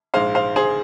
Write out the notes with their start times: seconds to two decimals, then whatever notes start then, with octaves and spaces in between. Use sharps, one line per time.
0.14 A#1 G#2 G#3 C5 F5
0.35 C5 F5
0.56 G#4 C5